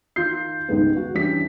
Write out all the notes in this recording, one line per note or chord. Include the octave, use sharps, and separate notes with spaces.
D#3 D#4 F4 G6 C7
C#2 G#2 D#3 G3 G#3 B3
F#4
E3 G3 C#4 D4 E4 B6